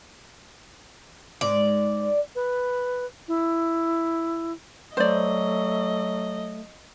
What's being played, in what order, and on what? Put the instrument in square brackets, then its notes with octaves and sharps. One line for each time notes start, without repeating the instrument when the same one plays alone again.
[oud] G#2 G#3 [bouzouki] D5
[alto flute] B4
E4
[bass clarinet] F#3 [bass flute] A3 [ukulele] C5 D5 [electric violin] D#5